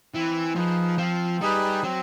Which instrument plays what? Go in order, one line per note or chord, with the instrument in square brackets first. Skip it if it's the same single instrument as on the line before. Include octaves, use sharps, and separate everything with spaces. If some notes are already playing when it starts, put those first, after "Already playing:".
[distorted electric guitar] E3 [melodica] C4
[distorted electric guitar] F3 [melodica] D#4 G#4 B4
[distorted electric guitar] F3 [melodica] C4
[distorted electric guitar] G3 [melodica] D#4 G#4 B4
[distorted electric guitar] F#3 [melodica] C4